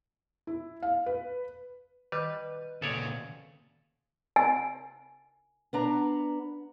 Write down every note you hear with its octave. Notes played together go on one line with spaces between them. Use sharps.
E4
F5
B4
D#3 G3 B4
A#2 C#3 A4 C#5 D5
G#5
B3 D4 A#5